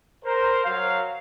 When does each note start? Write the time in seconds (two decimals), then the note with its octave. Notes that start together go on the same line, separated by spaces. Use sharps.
0.25 A#4 C5
0.64 F#3 F5